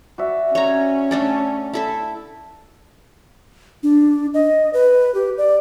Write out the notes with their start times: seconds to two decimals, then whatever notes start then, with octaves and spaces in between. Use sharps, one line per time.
0.18 F#4 D5 E5
0.55 C#4 C#5 A#5
1.11 A3 D4 A4
1.73 E4 A4 E5
3.83 D4
4.34 D#5
4.73 B4
5.15 G4
5.38 D5